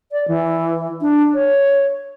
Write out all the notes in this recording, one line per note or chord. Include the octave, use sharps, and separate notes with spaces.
D5
E3
D4
C#5